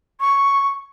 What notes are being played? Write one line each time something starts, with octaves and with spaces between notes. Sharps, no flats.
C#6